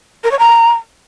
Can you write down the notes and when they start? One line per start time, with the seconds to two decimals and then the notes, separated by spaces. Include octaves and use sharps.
0.24 A#4
0.31 C#5
0.39 A#5